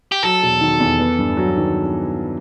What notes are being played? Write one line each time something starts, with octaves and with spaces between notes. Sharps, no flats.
G4
F#3 A4
E1
D#3
E2
B3
G2
F#3
D#3